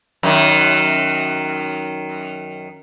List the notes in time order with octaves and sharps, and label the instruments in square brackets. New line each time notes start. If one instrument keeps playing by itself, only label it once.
[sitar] F#2 D#3